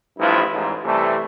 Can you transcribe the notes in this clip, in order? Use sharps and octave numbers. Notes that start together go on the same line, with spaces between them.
A1 G2 F3 E4 F4 B4
A1 G#2
C3 E3 G3 A3